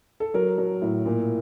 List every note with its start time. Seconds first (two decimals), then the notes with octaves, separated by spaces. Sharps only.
0.20 A4
0.34 F#3 A#4
0.58 F#3
0.82 A2
1.06 A#2